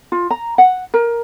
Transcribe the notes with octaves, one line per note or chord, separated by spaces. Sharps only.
F4
A#5
F#5
A#4